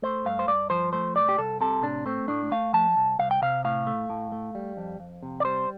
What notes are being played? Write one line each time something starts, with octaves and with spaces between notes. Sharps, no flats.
A3 C5
G2 F5
C5
G2 D5
F3 C5
A3 C5
C2 D5
G4
C2 A4
C3 A4
A2 D4
A3 C4
A2 D4
A3 F5
F3 A5
C2
C2 F5
G5
C3 F5
A2 F5
A3
A2
A3
G3
F2
F2
C3
D5
G3 C5